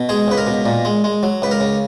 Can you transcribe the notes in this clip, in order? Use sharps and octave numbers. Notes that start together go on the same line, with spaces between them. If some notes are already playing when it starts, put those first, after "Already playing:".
Already playing: B2
G#3 G#4
C#2 B4
A#4
B2
A#2
G#3
G#3
F#3
C#2 B4
A#4
C#3